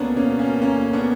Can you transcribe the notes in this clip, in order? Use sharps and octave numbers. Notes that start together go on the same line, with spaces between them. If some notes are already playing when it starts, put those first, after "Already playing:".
Already playing: D2 A#3 B3 C#4 D4
E1 A#3 C#4
A#3 C#4
D2 A#3 C#4
B3 D4